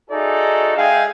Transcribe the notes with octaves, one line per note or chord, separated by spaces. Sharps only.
D#4 F#4 G#4 A4 D5 E5
G#3 G#4 E5 F5 G5